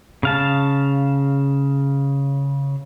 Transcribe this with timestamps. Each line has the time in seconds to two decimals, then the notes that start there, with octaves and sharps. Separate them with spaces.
0.23 C#3 F5 A5